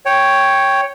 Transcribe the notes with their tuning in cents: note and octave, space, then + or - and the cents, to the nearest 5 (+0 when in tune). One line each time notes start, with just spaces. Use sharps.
C#5 +0 G5 +0